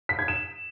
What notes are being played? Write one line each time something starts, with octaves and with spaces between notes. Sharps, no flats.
B6
G#6
E7